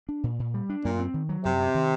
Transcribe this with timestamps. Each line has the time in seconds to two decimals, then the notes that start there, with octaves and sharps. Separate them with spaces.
0.09 D4
0.23 A#2
0.39 A#2
0.54 G3
0.69 D4
0.84 F#2 A#2
1.00 C4
1.14 D#3
1.29 F#3
1.44 F#2 C3
1.60 C4
1.74 D#3